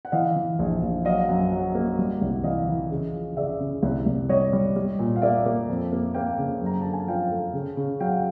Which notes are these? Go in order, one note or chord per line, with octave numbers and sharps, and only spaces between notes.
F#5
E3 D#5 F5
E3
A#1
A#1
F#3 D#5 F5
F#2
F#3
A#3
G3
C2
E3 D#5 F5
E3
C#3
F3
C#3 D5 E5
C#3
C2
C2
G3 C#5 D#5
G3
G3
A#2
F5
A#3 D5 E5
A#3
F2
A#3
A#3 F5 G5
C#3
F#2
A#5
D3 A5
G#5
F3 F5 G5
A3
C#3
C#3
F#3 F5 G5